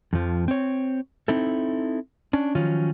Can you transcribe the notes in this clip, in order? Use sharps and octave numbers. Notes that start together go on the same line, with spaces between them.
F2 F3
C4 C#5
C4 D#4 E4 A4
C#4 D4
D#3 F3 F#3 C#4 F4